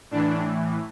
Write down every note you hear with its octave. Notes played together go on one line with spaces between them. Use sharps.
A2 E3 D4